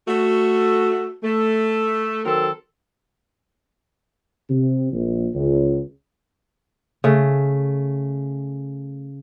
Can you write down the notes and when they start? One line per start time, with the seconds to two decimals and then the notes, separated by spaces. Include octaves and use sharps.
0.08 A3 F#4
1.23 A3
2.25 D#3 F#3 C4 A4 A#4
4.49 C3
4.93 A#1
5.35 C#2
7.04 C#3 A3